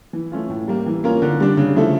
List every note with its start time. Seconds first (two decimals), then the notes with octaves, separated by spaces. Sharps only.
0.13 E3
0.31 A3 C#4 F4
0.50 A2
0.68 G3 A#3
0.86 E3
1.04 A#3 C#4 F4 A#4
1.22 D3
1.40 G3 D4
1.57 C#3
1.75 F3 A3 E4 A4